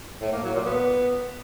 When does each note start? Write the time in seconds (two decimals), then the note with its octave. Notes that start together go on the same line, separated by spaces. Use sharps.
0.21 A2
0.33 A#3
0.44 F#3
0.55 A#2
0.66 B3